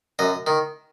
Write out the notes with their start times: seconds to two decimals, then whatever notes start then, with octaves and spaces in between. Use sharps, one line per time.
0.19 F#2 D#5
0.47 D#3